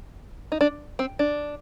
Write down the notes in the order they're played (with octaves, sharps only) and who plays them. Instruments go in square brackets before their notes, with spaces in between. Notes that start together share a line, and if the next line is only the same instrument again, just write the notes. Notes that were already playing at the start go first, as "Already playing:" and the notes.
[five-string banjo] D#4
D4
C4
D4